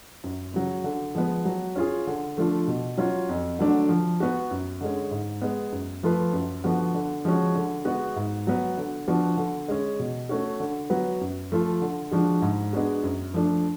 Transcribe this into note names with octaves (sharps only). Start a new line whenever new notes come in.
F#2
C#3 F#3
D3
F3 G#3 B3
F#3
C#4 F4 G#4
D3
F3 A3 D4 F4
B2
F#3 C#4 F4
F2
D3 F#3 A3 D4
F3
B3 F#4
F#2
D3 G#3 C#4
G#2
G#3 B3
F#2
F3 A3 F4 B4
F#2
D3 F3 B3 F#4
D3
F3 G#3 C#4 F#4
D3
G#3 B3 F#4
G#2
F#3 B3
D3
F3 B3 D4 F#4
D3
G#3 C#4
B2
A3 C#4 F#4
D3
F#3 B3 F#4 B4
F#2
F3 A3 F4
D3
F3 G#3 D4 F#4
G#2
G#3 B3 D4 F#4
F#2
F3 A3 D4